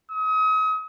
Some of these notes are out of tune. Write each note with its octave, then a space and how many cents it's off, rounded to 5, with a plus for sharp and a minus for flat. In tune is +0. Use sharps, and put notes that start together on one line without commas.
D#6 +40